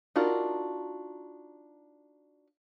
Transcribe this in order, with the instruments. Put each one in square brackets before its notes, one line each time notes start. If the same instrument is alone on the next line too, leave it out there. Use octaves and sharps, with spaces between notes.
[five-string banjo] D4 D#4 F4 F#4 A#4